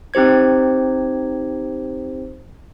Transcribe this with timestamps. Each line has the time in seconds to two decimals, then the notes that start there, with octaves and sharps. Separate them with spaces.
0.14 C4 D#4 G4 C5 G#6